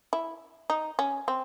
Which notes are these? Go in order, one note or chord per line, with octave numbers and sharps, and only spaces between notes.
E4
D#4
C#4
C4